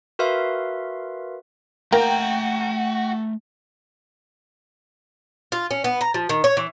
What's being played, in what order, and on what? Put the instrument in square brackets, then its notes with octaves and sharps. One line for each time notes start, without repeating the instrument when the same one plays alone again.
[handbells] F#4 A#4 B4 E5 F5 C6
[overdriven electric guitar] A3 A#5 [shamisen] A#3 [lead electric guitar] F#4 [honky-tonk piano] G5
[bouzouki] F4
C#4
B3
A#5
F3
D#3
C#5
E3